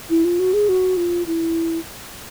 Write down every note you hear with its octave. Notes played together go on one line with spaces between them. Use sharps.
E4
F4
F#4
G#4
F#4
F4
E4